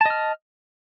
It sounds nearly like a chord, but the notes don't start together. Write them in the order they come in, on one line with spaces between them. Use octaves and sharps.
A5 D#5 F6